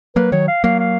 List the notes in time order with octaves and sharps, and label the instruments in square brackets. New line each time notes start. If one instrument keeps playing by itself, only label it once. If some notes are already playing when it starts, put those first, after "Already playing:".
[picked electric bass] F#3 A#3 [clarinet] B4
[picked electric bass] D#3 F#3 [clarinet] C#5
[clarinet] F5
[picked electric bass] F#3 A#3 [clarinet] F5
[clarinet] F5